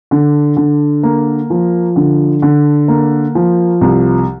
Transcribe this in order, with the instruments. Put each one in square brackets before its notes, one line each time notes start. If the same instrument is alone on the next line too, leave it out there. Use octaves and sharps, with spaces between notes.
[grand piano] D3
D3
A#3
F3
D3
D3
A#3
F3
C2